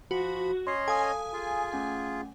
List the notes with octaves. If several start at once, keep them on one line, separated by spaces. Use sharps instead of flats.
F3 F#4 B5
C#4 C#5 D#5 C6 C7
A4 F5 G#5 D#6
F4 G#4
A3 C#4 F#5